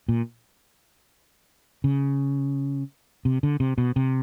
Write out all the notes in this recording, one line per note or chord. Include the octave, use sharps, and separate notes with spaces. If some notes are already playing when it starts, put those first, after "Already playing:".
A#2
C#3
C3
D3
C3
B2
C3